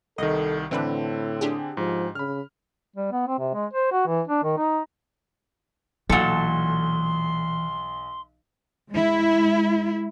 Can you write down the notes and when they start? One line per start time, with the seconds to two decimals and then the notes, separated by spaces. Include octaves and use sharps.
0.18 C2 D#3 A4 D#5
0.71 A2 D3 E3 C4 D4 B4
1.41 D4 G4 G#4
1.77 G#2 F3
2.15 C#3 B5 F6
2.96 G3
3.12 B3
3.28 C4
3.39 C3
3.54 G#3
3.73 C5
3.92 F#4
4.07 E3
4.28 D4
4.44 D#3
4.58 D#4
6.10 B1 A#2 E3 F#4 A4 C6
8.89 G#3 E4